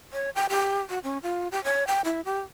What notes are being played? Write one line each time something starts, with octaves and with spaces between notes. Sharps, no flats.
C#5
G5
G4
F#4
C#4
F4
G4
C#5
G5
E4
G4